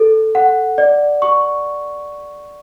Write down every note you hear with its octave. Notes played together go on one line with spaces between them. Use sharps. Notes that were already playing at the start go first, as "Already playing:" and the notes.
Already playing: A4
F#5
D5
C#6